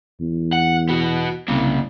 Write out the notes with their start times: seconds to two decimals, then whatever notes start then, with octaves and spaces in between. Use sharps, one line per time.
0.20 E2
0.53 F#5
0.89 B3 F#4
1.48 C2 C#3 A#3